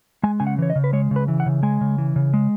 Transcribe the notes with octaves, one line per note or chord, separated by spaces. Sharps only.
G#3 G#5
C#3 G#5
F#5
E3 C#5
D#5
C#3
B4
G#3 C#5
C#3
B4
E3
F#5
C#3
G#3 G#5
C#3
E3
C#3
G#3